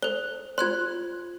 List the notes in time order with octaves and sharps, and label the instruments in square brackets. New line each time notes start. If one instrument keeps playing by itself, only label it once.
[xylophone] A4 G7 [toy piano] C5
[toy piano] F4 C5 [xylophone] C6 F#6 G#6